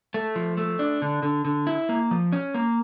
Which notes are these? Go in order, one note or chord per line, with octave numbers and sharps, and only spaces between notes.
A3
F3
A3
D4
D3
D3
D3
E4
A#3
F3
C#4
A#3